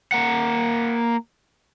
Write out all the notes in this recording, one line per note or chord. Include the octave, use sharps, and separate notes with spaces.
A#3 F#5